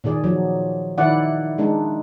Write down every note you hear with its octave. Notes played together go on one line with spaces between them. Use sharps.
A#2 D#3 G#4 D5
F3 F#3
D#3 E4 D5 F#5
G#3 D4 D#4